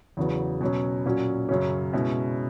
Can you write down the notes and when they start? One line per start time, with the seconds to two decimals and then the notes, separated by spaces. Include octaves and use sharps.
0.17 E2 C#3 F#3 B3 F#4
0.61 B2 F#3 C#4
1.06 A#2 F#3 C#4 F#4
1.49 F#2 C#3 F#3 C#4
1.93 B2 G#3 C#4 E4